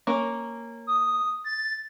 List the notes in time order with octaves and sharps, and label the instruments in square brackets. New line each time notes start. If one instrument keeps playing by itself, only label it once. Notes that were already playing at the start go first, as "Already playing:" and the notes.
[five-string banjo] A#3 C#4
[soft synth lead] D#6
A6